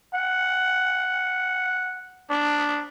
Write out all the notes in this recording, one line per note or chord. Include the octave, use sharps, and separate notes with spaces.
F#5
D4